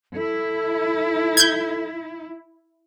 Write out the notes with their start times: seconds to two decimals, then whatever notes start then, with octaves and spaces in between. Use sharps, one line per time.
0.15 E4 A4
1.37 G6 G#6